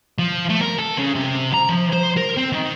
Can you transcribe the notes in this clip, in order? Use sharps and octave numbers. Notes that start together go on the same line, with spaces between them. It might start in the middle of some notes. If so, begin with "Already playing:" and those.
F3
A3
A#4
A4
C#3
C3
A#5
F3
C5
A#4
C4
D#3